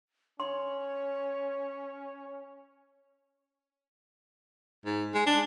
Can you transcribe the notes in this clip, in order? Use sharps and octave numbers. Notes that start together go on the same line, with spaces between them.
C#4 C#5 C6
G#2
G#3
D4